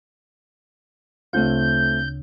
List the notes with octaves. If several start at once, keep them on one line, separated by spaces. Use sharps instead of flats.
D2 C#3 A3 C4 F4 G6